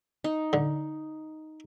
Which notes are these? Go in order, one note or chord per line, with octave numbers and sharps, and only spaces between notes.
D#4
D3